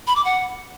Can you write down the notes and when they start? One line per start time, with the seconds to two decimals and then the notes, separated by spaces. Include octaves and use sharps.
0.07 B5
0.16 D6
0.25 F#5